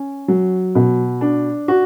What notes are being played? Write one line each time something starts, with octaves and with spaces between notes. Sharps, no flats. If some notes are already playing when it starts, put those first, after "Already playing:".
Already playing: C#4
F#3
B2
D4
F#4